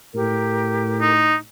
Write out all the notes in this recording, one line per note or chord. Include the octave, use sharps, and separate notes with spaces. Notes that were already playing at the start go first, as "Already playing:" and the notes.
A2 G4 A#4
D#4